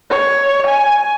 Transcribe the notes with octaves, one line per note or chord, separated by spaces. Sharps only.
C#5
G#5